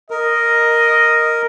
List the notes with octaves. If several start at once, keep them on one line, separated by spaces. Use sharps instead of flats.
A#4 D#5